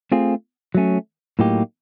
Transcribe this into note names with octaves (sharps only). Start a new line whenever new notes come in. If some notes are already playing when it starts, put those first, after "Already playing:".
A3 C4 F4 G#4
F#3 A3 C#4
A2 F#3 A#3 D#4 G4